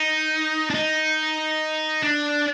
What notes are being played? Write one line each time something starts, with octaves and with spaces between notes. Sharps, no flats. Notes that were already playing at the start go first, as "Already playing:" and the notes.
Already playing: D#4
D4
D#4
D4